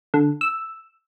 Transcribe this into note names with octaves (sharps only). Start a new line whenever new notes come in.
D3
E6